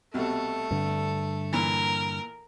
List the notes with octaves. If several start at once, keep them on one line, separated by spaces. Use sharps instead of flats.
C2 B2 A3 A4
G2 D3
A#2 E3 A#4